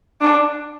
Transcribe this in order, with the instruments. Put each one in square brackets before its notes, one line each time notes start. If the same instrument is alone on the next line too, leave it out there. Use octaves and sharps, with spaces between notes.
[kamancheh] D4